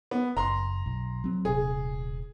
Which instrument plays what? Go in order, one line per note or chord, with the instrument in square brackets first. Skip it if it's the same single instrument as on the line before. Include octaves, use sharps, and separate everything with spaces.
[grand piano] B3
[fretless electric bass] F#1 [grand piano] A#5 C6
[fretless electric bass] B1
F#3 C4
[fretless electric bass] D#1 C3 [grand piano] G#4